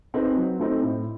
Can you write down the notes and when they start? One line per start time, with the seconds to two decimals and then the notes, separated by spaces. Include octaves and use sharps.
0.14 C4 D#4 G#4 B4
0.36 F#3
0.59 A3 C4 D#4
0.83 A2